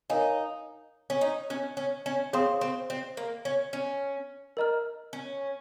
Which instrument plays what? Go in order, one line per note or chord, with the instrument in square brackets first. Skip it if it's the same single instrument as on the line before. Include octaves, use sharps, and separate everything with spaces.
[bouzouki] D#4 [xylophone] A#4 C#5 F5 G#5
[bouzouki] C#4
D#4
C#4
C#4
C#4
[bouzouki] C4 [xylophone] G#4 C#5 F5 C6 D#6
[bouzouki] C4
C4
A#3
C#4
C#4
[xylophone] A#4 D#5 A#5 F6
[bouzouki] C#4